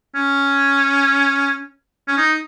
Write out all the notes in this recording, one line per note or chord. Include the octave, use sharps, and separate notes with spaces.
C#4
C#4
D#4